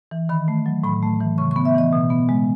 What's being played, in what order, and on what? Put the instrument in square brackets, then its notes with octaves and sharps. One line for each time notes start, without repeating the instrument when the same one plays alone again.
[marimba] E3
D#3 B5
A3
F#3
A2 B5
A3
E3
C#3 C#6
C#6
B3
E5
E3 D#5
B2
B3
G#3